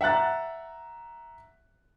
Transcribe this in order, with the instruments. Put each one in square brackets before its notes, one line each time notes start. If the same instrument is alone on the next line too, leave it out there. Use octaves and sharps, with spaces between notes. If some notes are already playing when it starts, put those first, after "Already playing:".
[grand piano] E5 F#5 A#5 F#6 A6